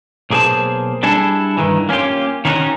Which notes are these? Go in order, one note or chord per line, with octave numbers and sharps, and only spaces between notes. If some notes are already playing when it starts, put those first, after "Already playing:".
B1 A#3 G#4 C5 A5
G3 D4 E4 G#4 A4
G2 D#3 E3
A#3 C#4 D#4 F4 G4
D#3 C#4 D#4 E4 F#4